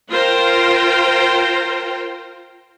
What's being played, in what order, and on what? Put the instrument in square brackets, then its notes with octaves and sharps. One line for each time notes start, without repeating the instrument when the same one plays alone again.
[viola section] F4 A#4 C5 G5